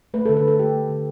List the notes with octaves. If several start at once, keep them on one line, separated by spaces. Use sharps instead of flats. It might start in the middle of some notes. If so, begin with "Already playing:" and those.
A3 B4
D3 A4
B4
D3 A4
A3 G4
A3
D3